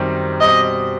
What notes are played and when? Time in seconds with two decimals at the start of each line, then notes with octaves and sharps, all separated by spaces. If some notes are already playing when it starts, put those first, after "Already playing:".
Already playing: F#2 D#3 G3 C4
0.41 B2 G3 C4 D#5